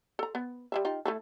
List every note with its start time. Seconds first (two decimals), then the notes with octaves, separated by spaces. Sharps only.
0.19 A4 A#5
0.35 B3
0.72 G3 G#3 E5
0.85 D#4 F4 G4
1.06 A3 E4 A4